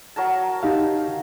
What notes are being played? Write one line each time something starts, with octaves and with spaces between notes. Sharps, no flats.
F#3 A#4 A5
D#4 G4 F5